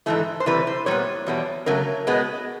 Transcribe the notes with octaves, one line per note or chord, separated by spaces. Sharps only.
G#2 E3 A3 A4
C5
C3 E3 G3 B4
C5
A#2 G3 B3 C#5
E2 B2 G3 B3
F#2 C#3 F#3 A3 A#4
B2 G#3 B3